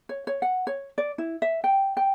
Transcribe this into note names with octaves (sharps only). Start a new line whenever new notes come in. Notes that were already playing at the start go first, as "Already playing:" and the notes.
C#5
C#5
F#5
C#5
D5
E4
E5
G5
G5